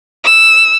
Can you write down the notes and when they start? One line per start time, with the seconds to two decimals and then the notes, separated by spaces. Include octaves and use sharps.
0.24 E6